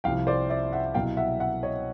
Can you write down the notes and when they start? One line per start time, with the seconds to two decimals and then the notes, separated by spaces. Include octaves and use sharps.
0.04 C2 C3 F3 F5 G5
0.27 C5 D5
0.49 D5 E5
0.72 E5 F#5
0.95 C2 B2 F#3 F5 G5
1.17 E5 F#5
1.40 E5 F#5
1.63 C#5 D#5